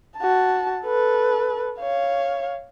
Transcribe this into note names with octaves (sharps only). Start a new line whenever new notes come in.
F#4 A5
A4 B4
C#5 F5